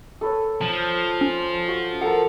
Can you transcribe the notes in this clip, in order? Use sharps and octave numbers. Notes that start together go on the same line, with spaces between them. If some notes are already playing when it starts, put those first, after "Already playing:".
A4 B4 C#5
F3 A5
C#4
F#4
A4 A#4 F#5